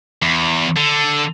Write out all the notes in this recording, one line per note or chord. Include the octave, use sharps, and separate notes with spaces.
E2
D3